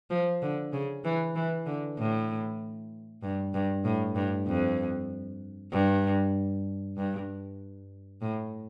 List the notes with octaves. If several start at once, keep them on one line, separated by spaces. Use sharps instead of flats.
F3
D3
C#3
E3
E3
D3
A2
G2
G2
A2
G2
F2
G2
G2
A2